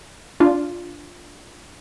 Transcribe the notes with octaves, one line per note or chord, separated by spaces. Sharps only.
D4 F4